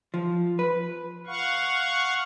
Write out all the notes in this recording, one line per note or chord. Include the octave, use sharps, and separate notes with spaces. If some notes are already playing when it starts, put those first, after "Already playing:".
F3
B4
F5 F#5 C#6